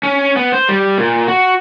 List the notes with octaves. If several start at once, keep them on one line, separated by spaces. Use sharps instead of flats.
C#4
B3
C5
G3
A#2
F#4